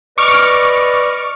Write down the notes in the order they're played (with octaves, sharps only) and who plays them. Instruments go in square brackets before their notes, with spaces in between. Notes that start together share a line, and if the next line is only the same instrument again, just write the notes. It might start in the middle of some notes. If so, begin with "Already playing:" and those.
[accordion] B4 D5 D#5 [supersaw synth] C#6 D6 F6